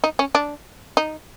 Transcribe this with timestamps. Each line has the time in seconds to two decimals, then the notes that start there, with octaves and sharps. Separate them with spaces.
0.04 D#4
0.19 C#4
0.35 D4
0.97 D#4